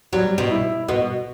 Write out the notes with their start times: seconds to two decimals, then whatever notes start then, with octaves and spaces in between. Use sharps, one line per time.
0.13 F#3 G3
0.38 B2
0.51 E4
0.88 B2 F#4